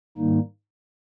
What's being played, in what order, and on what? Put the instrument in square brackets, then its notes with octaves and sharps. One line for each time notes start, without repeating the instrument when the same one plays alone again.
[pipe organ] G#2 D#3 G3 A#3 D#4